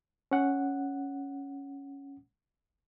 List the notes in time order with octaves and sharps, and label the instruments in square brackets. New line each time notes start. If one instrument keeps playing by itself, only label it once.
[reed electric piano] C#4 F#5